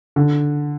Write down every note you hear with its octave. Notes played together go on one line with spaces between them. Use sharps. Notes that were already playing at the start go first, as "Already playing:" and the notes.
D3